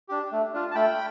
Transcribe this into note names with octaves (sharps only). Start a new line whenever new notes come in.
D4 G4
A3
D4 F4
A5
A3 G5 B5